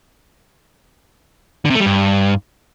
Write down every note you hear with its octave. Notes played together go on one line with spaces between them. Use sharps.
D3
C3
A3
G3
G2